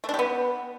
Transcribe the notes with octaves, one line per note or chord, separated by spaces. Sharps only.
A3
D4
G4
B3